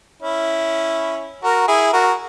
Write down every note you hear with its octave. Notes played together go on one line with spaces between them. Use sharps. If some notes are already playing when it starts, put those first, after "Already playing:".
C#4 E4
F#4 A#4
E4 G#4
F#4 A#4